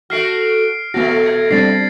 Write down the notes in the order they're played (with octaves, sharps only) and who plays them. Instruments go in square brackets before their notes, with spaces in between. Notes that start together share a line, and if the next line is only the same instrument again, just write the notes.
[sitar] A3 F#4 [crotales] F6 C7 D7
[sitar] B2 A3 [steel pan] B3 F#4 [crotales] A#6
[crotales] G#6
[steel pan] G3 C4 D4 [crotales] A6 C7